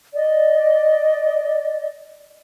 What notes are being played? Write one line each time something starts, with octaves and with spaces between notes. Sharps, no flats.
D5 D#5